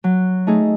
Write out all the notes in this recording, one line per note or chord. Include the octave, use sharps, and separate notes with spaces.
F#3
A3 D#4 G#4